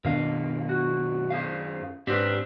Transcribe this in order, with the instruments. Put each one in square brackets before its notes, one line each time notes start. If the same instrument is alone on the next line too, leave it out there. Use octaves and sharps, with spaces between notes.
[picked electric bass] F#2 D#3 D4 [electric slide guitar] B2 [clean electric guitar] A#4 F5
[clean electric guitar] F#4
G#4 C5 F5
[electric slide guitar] G#2 C4 D4 [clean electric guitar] G4 B4